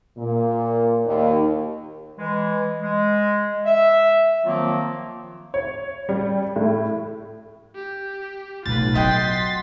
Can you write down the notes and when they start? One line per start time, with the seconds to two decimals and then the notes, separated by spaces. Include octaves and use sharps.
0.17 A#2
1.06 D#2
2.18 E3 G#3
2.81 G#3
3.65 E5
4.45 D#3 F3 F#3 A#3 C4 F4
5.54 C#5
6.09 G3
6.56 A2
7.75 G4
8.66 B1 A2 F4 B4 A6
8.95 F#3 D#5 F#5 G5 C6 B6